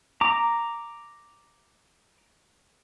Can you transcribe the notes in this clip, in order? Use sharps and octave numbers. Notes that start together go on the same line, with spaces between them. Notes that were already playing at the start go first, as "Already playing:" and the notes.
A#5 D6